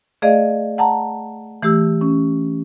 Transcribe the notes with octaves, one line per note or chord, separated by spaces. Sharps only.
A3 G#4 D5 D#5 F5
F#5 A5 A#5
E3 A3 G4 E6
C#4